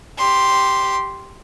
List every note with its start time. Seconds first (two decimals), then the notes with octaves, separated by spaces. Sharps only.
0.18 G4 C6